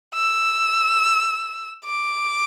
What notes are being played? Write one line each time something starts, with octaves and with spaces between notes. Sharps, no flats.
E6
D6